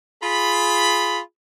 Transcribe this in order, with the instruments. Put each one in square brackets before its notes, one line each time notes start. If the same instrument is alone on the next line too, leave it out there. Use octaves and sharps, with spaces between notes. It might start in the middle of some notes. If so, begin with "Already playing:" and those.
[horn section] F4 G#4 B5